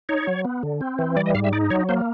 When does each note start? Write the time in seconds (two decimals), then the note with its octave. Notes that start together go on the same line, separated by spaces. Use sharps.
0.09 D#4 C#5
0.27 F#3
0.45 B3
0.63 D3
0.81 C4
0.99 E3
1.17 G3 D5
1.26 D#5
1.35 G#2 F5
1.44 E5
1.53 D#4 D5
1.70 F#3 C#5
1.89 A#3 C5